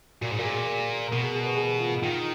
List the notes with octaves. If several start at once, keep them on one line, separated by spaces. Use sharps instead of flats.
A#2 F#4
G#2
A#2 A#4
G#4
A#4
B2 A#4
G#4
G#4
B4
G#4
F4
D#3 F4